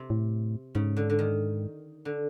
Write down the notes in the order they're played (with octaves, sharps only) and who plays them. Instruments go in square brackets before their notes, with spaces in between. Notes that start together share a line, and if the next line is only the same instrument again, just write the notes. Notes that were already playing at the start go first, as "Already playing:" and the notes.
Already playing: [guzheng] C3
[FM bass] A2
[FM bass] G#2 [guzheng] C#3
[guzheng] D3
D3
D#3
D3